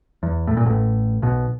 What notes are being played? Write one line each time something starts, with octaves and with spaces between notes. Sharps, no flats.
E2
A2
A#2
A1 A2
B1 B2